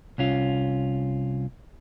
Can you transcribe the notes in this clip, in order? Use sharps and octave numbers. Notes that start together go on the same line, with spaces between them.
C2 C#4 F4